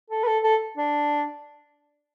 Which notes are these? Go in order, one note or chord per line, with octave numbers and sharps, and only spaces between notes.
A4
B4
A4
A4
D4